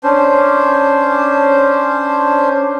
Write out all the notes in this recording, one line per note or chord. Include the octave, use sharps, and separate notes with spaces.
C#4 D4 C5